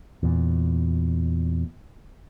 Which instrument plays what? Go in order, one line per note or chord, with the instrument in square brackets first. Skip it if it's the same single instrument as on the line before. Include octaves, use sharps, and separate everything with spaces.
[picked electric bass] E2 A#2